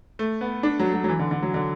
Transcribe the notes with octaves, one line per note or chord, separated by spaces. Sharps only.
A3
B3
D4
F#3
F#3
F#3
E3
D3
D3
F#3
D3